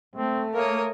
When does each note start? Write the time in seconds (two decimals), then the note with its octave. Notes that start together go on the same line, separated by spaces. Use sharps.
0.16 A3 C4
0.55 A#3 A#4 C#5 D#6